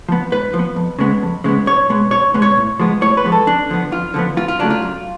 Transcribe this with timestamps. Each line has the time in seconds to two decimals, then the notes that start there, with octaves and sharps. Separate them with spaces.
0.09 F3 B3
0.32 G#2 B4
0.54 F3
0.59 B3
0.76 F2
0.99 C#3 G#3 B3
1.22 F2
1.44 C#3 G#3 B3
1.66 B1 C#5
1.89 B2 G#3 B3
2.11 B1 C#5
2.34 B2 G#3 B3
2.42 C#5
2.57 A2
2.79 F3 G#3 B3
3.01 A2 C#5
3.17 B4
3.24 F3 G#3 B3
3.32 A4
3.46 F2 D4
3.69 D3 F3 B3
3.92 F2 F4
4.14 D3 F3 B3
4.36 F#2 F4
4.48 F4
4.59 C#3 F#3 A3 D4
4.70 F4
4.82 F#2